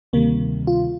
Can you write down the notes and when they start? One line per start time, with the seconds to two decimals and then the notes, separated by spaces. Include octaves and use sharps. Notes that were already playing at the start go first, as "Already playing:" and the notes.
0.13 D2 C3 D#3 G3 A#3
0.67 F4